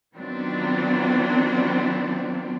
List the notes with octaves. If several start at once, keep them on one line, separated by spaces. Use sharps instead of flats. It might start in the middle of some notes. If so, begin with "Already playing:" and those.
D#3 F#3 B3 C4 D4 F4